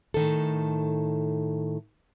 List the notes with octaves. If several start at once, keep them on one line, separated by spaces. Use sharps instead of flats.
A2 D#3 A4